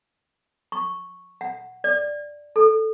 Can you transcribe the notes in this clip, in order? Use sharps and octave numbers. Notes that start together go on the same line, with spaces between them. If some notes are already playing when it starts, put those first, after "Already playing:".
C#6
F#5
D5
A4